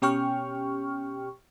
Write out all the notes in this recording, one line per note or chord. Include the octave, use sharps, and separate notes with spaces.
B2 C#4 G4 G5 C#6 F6